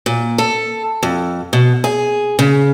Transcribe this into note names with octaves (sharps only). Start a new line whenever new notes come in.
A#2
A4
F2
B2
G#4
C#3